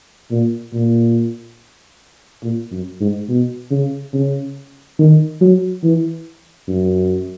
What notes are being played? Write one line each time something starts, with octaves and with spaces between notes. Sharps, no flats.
A#2
A#2
A#2
F#2
G#2
B2
C#3
C#3
D#3
F#3
E3
F#2